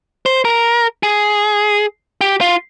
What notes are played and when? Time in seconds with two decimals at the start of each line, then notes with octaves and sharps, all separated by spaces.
0.26 C5
0.45 A#4
1.03 G#4
2.21 G4
2.41 F4